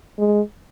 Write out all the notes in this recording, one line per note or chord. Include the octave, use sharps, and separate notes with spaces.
G#3